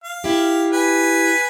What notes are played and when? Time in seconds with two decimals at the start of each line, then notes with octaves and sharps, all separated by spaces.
0.04 F5
0.24 E4 G4
0.73 B4 G#5